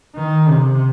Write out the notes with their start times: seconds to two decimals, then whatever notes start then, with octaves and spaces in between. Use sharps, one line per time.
0.16 D#3
0.49 C3